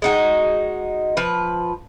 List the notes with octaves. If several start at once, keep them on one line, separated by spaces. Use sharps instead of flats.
G#3 D#4 F#4
F3 B4